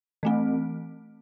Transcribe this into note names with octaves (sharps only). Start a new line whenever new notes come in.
E3 A3 C4